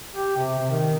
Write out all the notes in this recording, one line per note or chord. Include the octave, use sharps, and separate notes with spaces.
G4
C3
C3
D#3